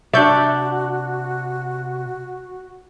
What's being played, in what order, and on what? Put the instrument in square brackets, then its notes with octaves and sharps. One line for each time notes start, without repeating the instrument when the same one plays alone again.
[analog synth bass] C3 [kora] D4 D5 [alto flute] F#4 [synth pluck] E5 C#6 G6